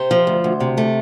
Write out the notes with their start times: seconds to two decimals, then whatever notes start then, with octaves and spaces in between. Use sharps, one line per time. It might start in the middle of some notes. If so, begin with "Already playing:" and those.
Already playing: C3 C5
0.11 F3
0.27 D2
0.44 D2
0.60 C3
0.78 A3